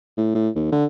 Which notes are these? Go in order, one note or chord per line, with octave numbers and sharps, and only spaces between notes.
A2
A2
D#2
D3